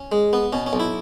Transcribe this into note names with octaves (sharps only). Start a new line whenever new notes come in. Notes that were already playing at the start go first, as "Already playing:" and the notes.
Already playing: C#4
G#3
B3
B2 C#4
C#4
B1
E4